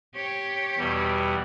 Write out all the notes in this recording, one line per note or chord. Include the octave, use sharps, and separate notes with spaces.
G4 C#5
E2 B2 G3